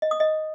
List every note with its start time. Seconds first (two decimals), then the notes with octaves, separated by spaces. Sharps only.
0.02 D#5
0.11 D#6
0.20 D#5